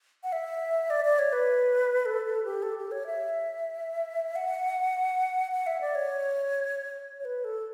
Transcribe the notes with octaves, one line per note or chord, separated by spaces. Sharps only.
F#5
E5
D5
D5
C#5
B4
A4
A4
G4
A4
G4
C#5
E5
F#5
F#5
E5
D5
C#5
C#5
B4
A4